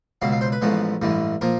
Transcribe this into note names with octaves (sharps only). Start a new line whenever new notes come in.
C#2 B2 F#3 F5
F5
C5
B4
A1 A2 F3 G#3 B3
A1 G2 E3 G#3
A#2 F3 A#4